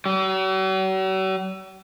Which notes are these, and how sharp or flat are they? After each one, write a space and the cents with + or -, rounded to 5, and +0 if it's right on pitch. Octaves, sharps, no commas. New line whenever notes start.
F#3 +45